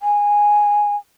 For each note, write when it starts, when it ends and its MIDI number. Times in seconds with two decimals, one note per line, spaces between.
0.01 0.95 80